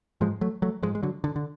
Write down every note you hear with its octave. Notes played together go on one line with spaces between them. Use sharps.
G#2 F3 G#3
F#3 A3
F#3 A3
G#2 F3 G#3
G#3
D3 F#3
D3
D3